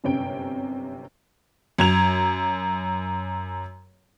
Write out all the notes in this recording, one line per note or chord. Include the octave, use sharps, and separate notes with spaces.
G1 F#2 C3 C#4 G5 D7
F#2 G#6 F7